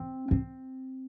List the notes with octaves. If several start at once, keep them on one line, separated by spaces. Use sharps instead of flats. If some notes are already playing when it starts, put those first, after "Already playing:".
Already playing: C4
C4